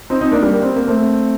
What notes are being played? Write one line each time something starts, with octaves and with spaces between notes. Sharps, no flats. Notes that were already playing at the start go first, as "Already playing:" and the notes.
C4 D#4
C4 D#4
A#3 D4
G3 A#3
C4
A#3
A3 C4